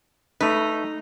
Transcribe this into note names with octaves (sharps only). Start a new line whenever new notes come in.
A3 D#4 B4